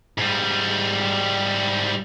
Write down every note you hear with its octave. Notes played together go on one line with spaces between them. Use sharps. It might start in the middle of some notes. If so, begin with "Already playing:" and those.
G#2 G3